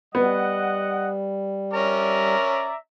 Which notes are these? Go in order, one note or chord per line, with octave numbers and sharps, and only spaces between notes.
G3 B3 D#5 F#5
C#4 A#4 D5 E5 A#5